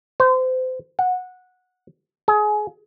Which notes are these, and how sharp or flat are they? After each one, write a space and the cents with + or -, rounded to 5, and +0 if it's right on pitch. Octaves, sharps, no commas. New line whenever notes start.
C5 -30
F#5 -15
G#4 +25